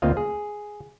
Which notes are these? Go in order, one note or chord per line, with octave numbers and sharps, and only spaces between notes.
D2 A#3 C4 F4 D#5 F5
G#4